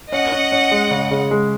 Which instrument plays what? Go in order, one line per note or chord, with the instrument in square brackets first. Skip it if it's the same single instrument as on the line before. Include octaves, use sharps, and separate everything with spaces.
[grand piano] C#4 [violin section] D#5 F#5
[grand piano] C#4
C#4
G#3
C#3
C#3
G#3